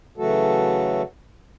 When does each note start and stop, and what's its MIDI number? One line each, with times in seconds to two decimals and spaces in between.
0.18 1.02 49
0.18 1.02 52
0.18 1.02 54
0.18 1.02 57
0.18 1.02 66
0.18 1.02 69